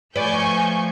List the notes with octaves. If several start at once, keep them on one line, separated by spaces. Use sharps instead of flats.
F3 A3 B4 D5 G#5 C#6 G6